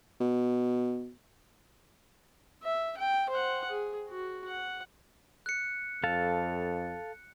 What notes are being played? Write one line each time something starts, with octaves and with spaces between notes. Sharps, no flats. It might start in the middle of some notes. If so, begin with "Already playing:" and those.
B2
E5
G5
C5 F#5
G#4
F#4
F#5
F#6 C#7
F2 A4 F5 A5